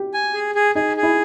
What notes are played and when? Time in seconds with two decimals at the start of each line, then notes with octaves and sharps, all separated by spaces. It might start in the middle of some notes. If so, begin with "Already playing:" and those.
Already playing: G4
0.14 G#5
0.34 G#4
0.55 G#4
0.75 D#4 G#4
0.97 G#4
1.03 E4